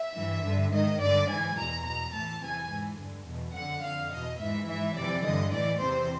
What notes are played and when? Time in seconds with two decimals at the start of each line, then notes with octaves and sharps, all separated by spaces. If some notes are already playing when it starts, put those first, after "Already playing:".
Already playing: E5
0.16 G2 E3
0.45 G2 D3
0.73 G#2 D#3 D#5
1.01 G2 D3 D5
1.29 G#2 E3 G#5
1.57 E2 B2 A#5
1.86 E2 B2 A#5
2.14 A2 E3 A5
2.42 E2 C3 E3 G#5
2.70 G#2 E3
2.99 G2 D3
3.27 E2 B2
3.55 F2 D3 F#5
3.83 F2 D3 F5
4.11 E2 B2 D#5
4.40 G#2 E3 E5
4.68 G#2 E3 E5
4.96 F2 C3 E3 D5
5.25 G2 D3 D#5
5.53 A2 E3 D5
5.81 E2 C3 E3 C5